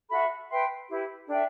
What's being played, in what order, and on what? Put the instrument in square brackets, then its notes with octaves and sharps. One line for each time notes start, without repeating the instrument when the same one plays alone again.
[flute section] F#4 A4 E5 B5
B4 E5 G5 C6
E4 G4 B4
D4 A4 E5 G5